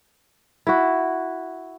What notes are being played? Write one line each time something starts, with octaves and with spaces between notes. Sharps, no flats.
E4 F#4